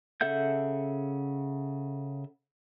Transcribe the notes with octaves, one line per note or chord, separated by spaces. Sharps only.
C#3 A4 E5 F#5 G6